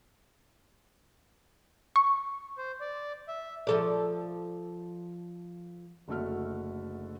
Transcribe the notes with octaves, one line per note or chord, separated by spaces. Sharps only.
C#6
C5
D5
E5
F3 A4 D5
F#1 D3 A3 F#4 E5 F6